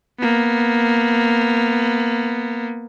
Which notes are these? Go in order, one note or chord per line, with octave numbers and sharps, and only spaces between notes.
A#3 B3